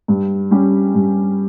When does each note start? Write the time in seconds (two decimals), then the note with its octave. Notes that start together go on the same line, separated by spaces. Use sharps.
0.08 G2
0.51 G3 C#4 G4
0.95 G2